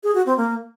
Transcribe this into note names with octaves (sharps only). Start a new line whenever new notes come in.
G#4
F#4
C4
A#3